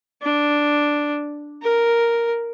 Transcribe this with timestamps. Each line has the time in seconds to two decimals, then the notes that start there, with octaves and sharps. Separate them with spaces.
0.22 D4
1.62 A#4